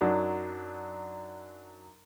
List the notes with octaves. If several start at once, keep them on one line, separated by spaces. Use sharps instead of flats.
F#2 F#3 D4 D#4